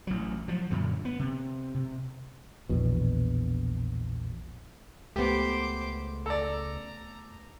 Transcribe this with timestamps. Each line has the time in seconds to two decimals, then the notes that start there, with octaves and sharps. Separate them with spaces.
0.07 A1 F#3
0.48 F3 F#3
0.71 F#2 A#2 D3
1.05 B3
1.19 C3
1.74 C3
2.69 A#1 E2 B2
5.16 C#2 A3 B3 G4 C5 D6
6.26 A4 D5 A#5